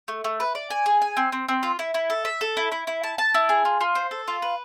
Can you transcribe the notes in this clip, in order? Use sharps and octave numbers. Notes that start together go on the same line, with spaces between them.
A3
A3
B4
D5
G#5
G#4
G#5
C4
C4
C4
F4
E4
E4
A4
E5
A4
E4
E4
E4
A5
A5
E4
G#4
F4
F4
C5
A4
F4
B4